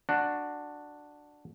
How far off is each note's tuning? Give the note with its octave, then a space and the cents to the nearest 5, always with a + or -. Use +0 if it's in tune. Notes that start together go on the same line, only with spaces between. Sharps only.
D4 +5 F#4 -5